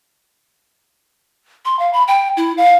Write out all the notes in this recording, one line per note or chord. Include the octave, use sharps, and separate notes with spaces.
C6
F5
B5
G5
E4
F5